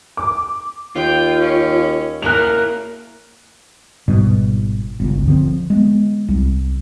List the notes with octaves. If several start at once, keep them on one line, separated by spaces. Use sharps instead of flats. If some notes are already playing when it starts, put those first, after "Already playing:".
D6
D#2 F4 G5
C#4
A#3 E4 A#4 F#6 F7
G#1 G#2 B2 G3
G1 C#2
D3 F3 C4
G#3 B3
C2